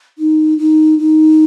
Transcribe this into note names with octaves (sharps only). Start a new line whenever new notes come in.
D#4
D#4
D#4